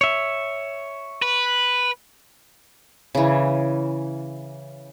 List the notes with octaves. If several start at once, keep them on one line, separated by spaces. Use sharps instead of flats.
C#5 E5
B4
C#3 E3